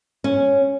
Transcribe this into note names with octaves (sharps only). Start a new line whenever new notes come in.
C#4